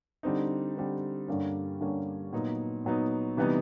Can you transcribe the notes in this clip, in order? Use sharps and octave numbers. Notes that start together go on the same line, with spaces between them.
D3 G3 C4 D#4
D3 G3 C4 D#4
G2 D3 G3 A#3 C#4
G2 D3 G3 A#3 C#4
A#2 F#3 B3 D#4
A#2 F#3 B3 D#4
C3 E3 G3 B3 D#4